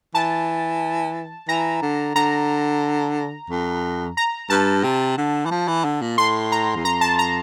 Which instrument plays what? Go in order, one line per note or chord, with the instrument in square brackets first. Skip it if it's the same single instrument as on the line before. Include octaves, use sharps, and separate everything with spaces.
[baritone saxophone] E3 [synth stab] A5
[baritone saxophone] E3 [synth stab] A#5
[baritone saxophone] D3
[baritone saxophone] D3 [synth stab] A#5
[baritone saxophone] F2
[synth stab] A#5
[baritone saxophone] G2 [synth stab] A5
[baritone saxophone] C3
D3
E3
F3
E3
D3
A#2
[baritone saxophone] A2 [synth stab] C6
[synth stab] A#5
[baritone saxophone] E2
[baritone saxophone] F2 [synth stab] A#5
[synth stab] A5
A#5